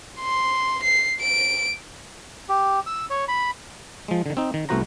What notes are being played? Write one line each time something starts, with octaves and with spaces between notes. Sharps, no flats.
C6
C7
D7
G4
E6
C#5
B5
F3 G#3
D3 D#3
C4 D#4
D#3
C2 A3 B3 F#4 C5 A#5